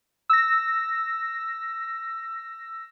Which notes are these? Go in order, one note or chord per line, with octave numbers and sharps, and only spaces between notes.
E6 A#6